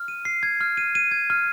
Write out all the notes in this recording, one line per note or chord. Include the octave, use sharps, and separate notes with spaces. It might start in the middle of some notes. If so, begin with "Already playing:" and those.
Already playing: F6
D#7
C7
G#6
F6
D#7
D#7
G#6
F6